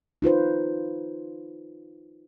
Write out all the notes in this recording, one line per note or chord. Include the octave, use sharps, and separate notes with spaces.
D#4 F4 B4 C5